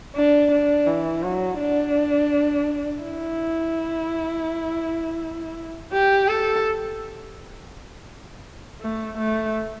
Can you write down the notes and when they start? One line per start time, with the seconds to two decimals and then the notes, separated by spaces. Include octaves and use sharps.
0.15 D4
0.52 D4
0.87 E3
1.23 F#3
1.60 D4
3.03 E4
5.93 G4
6.28 A4
8.81 A3
9.18 A3